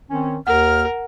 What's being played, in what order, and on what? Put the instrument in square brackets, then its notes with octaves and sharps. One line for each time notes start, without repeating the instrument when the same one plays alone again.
[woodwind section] D#3 C4 C#4
[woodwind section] D#2 [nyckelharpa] A#4 [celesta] F#5 [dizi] F6